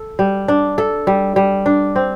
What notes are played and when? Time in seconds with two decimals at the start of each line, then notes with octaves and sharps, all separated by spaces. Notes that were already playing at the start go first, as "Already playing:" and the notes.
Already playing: A4
0.19 G3
0.48 D4
0.78 A4
1.07 G3
1.36 G3
1.66 D4
1.96 C4